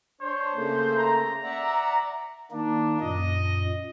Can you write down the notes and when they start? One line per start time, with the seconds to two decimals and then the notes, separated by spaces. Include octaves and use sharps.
0.21 D4 C5 C#5
0.54 C#3 A3 A#3
0.98 A#5
1.44 D5 E5 F#5
2.51 D#3 A#3 D4 D#4
3.00 F#2 A#2 D#5